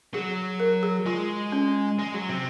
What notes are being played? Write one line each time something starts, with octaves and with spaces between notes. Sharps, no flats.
F#3 G#4
A#4
G#4
G#3 F4
C#4
G#3
F#3
C3